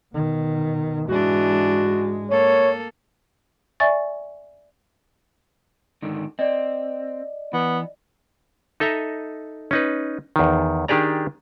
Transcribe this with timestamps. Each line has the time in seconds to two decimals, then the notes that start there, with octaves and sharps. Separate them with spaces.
0.13 B2 D#3
1.09 G#2 E3 G#3 D4 F#4
2.30 A#3 A4 C#5
3.80 D5 E5 G#5 C#6 A6
6.02 G#2 D3 D#3
6.39 C4 D5 D#5
7.53 E3 B3
8.80 D#4 A4 D#5 E5 A#5
9.71 C#4 D#4 B4
10.36 E2 D#3
10.88 D#3 D4 G4 G#4 D5 A#5